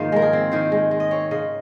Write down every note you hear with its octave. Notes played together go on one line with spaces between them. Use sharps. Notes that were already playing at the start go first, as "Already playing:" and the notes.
Already playing: G#2 D#3 F3 A#3 C5
G#3 A#4
G#4
C4
D#3 C5
G#3
G#3
D#5
C4 C#5
C#3 D#5